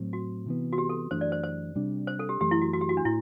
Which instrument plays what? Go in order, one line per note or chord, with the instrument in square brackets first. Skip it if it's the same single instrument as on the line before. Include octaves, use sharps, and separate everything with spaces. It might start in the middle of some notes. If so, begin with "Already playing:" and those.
Already playing: [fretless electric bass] A2 F#3 C4
[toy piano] F#4
[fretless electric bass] C3 E3 B3
[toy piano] F#4
G4
A4
[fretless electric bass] F#2 E3 A3 D4 [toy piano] C5
[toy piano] D5
C5
C5
[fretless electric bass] C3 G3 D4
[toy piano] C5
A4
G4
[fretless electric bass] F#2 E3 A3 [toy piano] G4
[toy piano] E4
F#4
F#4
G4
F#4
D4
[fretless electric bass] A2 [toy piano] E4